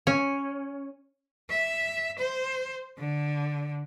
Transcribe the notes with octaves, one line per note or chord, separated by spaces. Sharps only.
C#4
E5
C5
D3